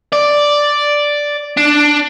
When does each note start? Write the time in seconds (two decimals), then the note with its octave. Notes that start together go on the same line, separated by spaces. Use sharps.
0.13 D5
1.57 D4